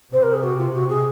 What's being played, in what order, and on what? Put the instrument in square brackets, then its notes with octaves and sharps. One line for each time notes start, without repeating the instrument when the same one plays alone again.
[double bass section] C3 [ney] C5
[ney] A#4
G#4
F#4
F4
F#4
G#4